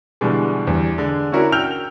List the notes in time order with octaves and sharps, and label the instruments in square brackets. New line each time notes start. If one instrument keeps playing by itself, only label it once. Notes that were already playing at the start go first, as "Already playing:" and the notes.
[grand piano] B2 D3 E3 G3 G#3
E2 G3
D3 G#3
C#4 D4 E4 F#4 A#4
G5 E6 F6 G6 F7